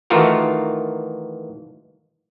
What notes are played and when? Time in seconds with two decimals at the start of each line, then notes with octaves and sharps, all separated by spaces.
0.10 D#3 E3 A3 F4 F#4 A#4